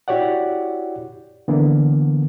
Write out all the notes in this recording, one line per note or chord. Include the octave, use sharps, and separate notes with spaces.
E4 F#4 G4 C#5 D5 F#5
D3 E3 A#3 B3